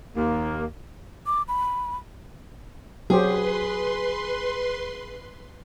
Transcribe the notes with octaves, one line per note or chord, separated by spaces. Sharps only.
D#2 A#3
D6
B5
F#3 G4 G#4 B4 C5 C6